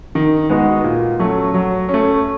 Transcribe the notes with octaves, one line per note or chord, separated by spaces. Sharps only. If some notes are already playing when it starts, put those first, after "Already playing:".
D#3
G#3 B3 D#4 F#4
A#2
F#3 A3 C#4
F#3
A3 C#4